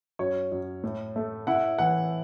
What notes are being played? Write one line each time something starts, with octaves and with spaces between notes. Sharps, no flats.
F#2 C#5
F#2
A2
A3
E4 F#5
E3 F#5